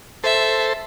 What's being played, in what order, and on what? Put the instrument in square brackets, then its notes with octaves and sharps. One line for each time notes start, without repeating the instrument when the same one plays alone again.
[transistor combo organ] A4 C5 [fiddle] E5